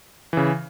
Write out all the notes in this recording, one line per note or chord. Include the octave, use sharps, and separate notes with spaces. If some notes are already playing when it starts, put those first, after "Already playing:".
C#3 E3